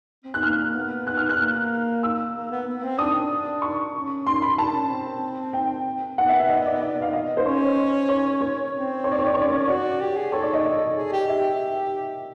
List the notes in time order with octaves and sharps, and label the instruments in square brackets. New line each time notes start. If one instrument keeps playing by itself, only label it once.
[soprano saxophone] C4
[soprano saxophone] B3 [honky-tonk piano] F#6
[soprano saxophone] A#3 [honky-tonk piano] F6
[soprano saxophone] B3
[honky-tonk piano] F#6
F6
F#6
[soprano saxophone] A#3 [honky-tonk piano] F6
[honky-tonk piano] E6
[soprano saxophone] A#3
B3
B3
C4
[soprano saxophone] D4 [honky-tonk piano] D#6
[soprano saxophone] D4
[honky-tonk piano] C#6
[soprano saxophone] C#4
[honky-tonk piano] C6
B5
[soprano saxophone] D4 [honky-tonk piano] A5
[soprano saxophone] C#4
C4
[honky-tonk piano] G5
[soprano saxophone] B3 [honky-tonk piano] F#5
[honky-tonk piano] E5
E5
D#5
D5
D5
F5
D#5
C5
[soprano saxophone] C#4 [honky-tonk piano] C#5
[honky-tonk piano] C#5
C#5
[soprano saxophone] C4
[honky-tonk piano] C#5
D5
C#5
D5
[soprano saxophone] C#4 [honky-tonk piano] C#5
[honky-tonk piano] D5
C#5
[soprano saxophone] F#4 [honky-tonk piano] D5
[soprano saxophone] G4
G#4
[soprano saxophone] A4 [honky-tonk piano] C#5
[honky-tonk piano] D5
D#5
D#5
[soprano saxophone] G#4
G4
[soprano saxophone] G4 [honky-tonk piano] E5